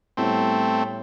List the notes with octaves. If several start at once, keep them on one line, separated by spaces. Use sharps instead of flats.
A2 G3 A3 B3 C4